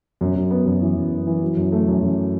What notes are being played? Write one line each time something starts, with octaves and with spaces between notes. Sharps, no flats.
F#2
F#2
B3
F#2
E3
F#2
F#2
E3
F#3
F#2
A3
F#2
F#2